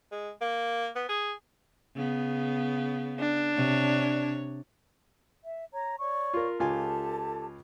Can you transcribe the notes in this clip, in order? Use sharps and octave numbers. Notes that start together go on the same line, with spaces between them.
G#3
A#3
B3
G#4
C#3 B3
D4
C3 C#5
E5
C#5 A#5
C#5 D5 C#6
F4 A#4
C#2 F4 G4 A4 G#5 A5